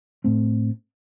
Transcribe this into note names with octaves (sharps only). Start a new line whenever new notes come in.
A2 A3 C4